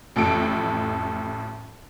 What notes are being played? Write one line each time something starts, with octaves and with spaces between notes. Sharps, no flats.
A1 F2 A2 A4 D7